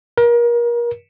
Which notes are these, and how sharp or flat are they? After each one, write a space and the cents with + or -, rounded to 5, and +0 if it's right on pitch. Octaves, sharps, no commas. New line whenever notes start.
A#4 +30